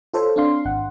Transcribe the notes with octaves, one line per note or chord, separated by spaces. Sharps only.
F4 A4 C5 C#5
C4 D4 F5 C6
G#1 F#5